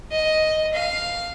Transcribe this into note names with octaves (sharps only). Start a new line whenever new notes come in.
D#5
F5